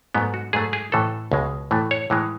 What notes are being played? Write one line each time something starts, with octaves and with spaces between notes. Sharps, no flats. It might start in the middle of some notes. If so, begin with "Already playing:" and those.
G#2 F#3 A3 B3
F#4
G#2 F#3 A3 G#4
G#4
A2 E3 A3 A4
C#2 B2 G#3
A2 E3 A3
C#5
A2 E3 G#3